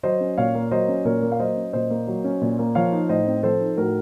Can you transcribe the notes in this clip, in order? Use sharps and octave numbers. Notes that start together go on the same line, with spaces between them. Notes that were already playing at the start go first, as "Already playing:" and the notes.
F#3 C5 D#5
C#4
A#2 C#5 F5
A#3
F#3 C5 D#5
C#4
A#2 A#4 C#5
A#3
F5
F#3 C5 D#5
C#4
A#2 C5 D#5
A#3
F#3
C#4
A#2
A#3
F3 C#5 F5
D#4
A2 C5 D#5
C4
F3 A4 C5
D#4
A2 F#4 A#4